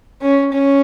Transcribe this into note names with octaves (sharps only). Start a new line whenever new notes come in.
C#4
C#4